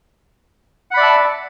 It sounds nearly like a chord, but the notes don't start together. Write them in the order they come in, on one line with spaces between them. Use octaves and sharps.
F#5 B5 D5 E5 A5